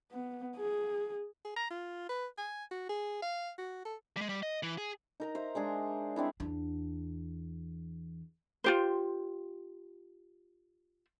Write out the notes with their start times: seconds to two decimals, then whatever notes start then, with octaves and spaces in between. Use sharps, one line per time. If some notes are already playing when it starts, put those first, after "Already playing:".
0.11 B3
0.57 G#4
1.45 G#4
1.56 A#5
1.70 F4
2.09 B4
2.38 G#5
2.71 F#4
2.89 G#4
3.22 F5
3.59 F#4
3.85 A4
4.17 G3 G#3
4.29 G3
4.43 D#5
4.63 E3
4.78 G#4
5.20 D#4 A#4 A#5
5.35 C5 E5
5.55 G#3 D4 G#4
6.16 G#3 C4 D4 E4
6.40 E2 D4
8.64 F4 G4 C5